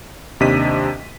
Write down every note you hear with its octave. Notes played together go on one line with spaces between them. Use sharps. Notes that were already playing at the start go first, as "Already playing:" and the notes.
D#2 C3 D4 D#5 B6 D#7